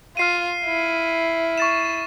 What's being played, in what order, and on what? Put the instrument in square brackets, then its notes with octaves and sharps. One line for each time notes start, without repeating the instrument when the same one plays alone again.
[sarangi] F4 [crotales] F6 C7 D#7
[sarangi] E4
[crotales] C#6 A6 E7